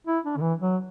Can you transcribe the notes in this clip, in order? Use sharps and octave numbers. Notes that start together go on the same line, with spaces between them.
E4
D4
D3
E3
F#3